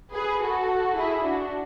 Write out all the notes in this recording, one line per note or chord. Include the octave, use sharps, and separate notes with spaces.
G#4 B4
F#4 A4
E4 G#4
D4 F#4